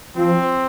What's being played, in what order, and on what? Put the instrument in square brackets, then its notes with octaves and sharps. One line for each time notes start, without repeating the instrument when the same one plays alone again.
[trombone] F3 [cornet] C4